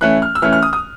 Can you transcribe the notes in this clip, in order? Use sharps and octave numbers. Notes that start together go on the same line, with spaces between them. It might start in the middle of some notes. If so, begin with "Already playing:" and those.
E3 A3 C#4 F#6
F6
E6
E3 A3 C#4 F6
F6
D#6
D#6